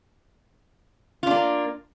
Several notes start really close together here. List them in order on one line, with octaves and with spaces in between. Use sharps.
F4 D4 A#3